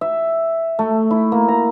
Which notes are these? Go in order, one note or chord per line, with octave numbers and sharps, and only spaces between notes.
E5
A3
E4
A#3
A#5